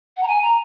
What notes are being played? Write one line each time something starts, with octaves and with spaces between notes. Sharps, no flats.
F#5
A#5
G#5
A#5